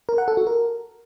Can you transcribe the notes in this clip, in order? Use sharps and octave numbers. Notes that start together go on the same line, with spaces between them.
A#4
F#5
A4
F#4
A#4